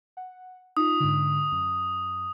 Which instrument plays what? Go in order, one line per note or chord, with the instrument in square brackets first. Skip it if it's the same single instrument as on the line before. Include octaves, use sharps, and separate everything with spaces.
[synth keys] F#5
[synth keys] D#4 F4 [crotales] D#6
[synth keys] G#2 D3
F#2